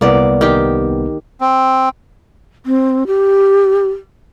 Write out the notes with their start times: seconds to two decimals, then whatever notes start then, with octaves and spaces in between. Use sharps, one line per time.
0.01 C2 A#3 B3 D5
0.41 D#3 G4
1.41 C4
2.66 C4
3.07 G4